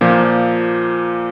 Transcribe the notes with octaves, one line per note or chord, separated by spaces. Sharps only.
A#2 F3 A#3